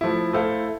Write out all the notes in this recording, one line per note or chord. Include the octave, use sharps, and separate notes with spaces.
F3 A3 E4
A3 E4 A4 C5 F5